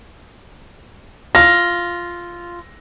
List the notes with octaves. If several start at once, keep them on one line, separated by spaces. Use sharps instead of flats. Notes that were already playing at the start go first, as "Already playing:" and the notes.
F4 A#6